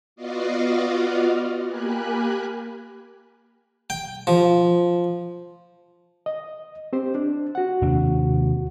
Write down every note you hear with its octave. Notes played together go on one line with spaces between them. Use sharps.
B3 F4 F#4 D5 D#5 F5
A#3 G4 A#4 G#5 B5 F#6
G5
F3
D#5
C4 G4 C5
D4
F#4 F#5
D#2 C3 D4